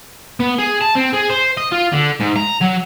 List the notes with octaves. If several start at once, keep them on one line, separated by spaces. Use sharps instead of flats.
B3
G#4
A5
C4
G#4
C5
D#5
F4
D3
G#2
A#5
F#3